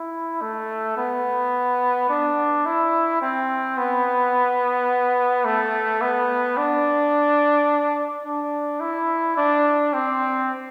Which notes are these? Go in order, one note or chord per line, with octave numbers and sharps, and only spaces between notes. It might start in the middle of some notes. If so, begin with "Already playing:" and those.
Already playing: E4
A3
B3
D4
E4
C4
B3
A3
B3
D4
D4
E4
D4
C4